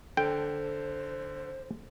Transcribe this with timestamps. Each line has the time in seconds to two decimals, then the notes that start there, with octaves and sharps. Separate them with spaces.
0.17 D3 A4 C5 G5